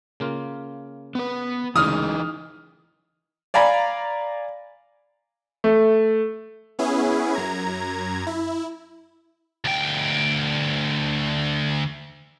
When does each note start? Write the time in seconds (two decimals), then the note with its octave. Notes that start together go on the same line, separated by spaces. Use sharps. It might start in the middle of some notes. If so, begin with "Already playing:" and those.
0.20 C#3 A#3 F4
1.15 B3 B4
1.76 D2 C#3 E3 G#3 D#4 D#6 F6
3.54 D5 F5 G#5 A#5 B5
5.64 A3
6.79 B3 C#4 E4 G#4
7.33 F#2 A#5 G#6
8.27 E4
9.65 D2 G5